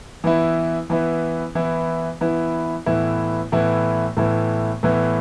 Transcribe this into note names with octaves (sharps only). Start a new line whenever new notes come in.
E3 B3 E4
E3 B3 E4
E3 B3 E4
E3 B3 E4
A2 E3 B3 E4
A2 E3 B3 E4
A2 E3 B3 E4
A2 E3 B3 E4